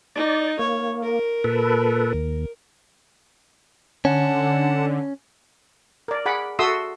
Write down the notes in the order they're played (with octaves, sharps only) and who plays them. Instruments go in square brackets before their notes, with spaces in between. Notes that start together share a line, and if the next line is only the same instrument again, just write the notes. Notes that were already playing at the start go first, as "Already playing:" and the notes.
[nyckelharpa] D#4 [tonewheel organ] D5
[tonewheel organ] A#3 [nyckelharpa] C#5
[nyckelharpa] A#4
[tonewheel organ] A#2 A4 B4
D#2
[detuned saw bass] D3 [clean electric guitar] C#4 [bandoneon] F#5 A5
[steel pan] A#4 D5
G#4 F#5 B5 D6
F#4 A4 E5 C6 D#6 E6